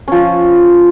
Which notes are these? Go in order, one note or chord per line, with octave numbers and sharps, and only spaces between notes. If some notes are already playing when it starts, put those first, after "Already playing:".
F3 C#4